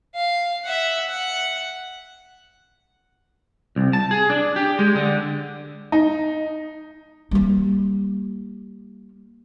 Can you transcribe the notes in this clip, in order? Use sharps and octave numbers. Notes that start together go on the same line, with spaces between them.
F5
E5 F#5
F#5
C2
A5
G#4
D4
G4
G#3
D3
D#4
G3 A#3